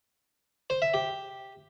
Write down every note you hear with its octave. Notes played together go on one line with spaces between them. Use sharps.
C5
E5
G4